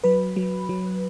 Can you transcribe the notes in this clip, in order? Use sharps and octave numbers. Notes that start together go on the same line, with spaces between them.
F#3 B4 B5
F#3
F#3